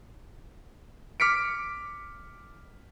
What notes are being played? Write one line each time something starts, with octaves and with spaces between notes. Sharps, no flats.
D6 F6 B6 C#7 D7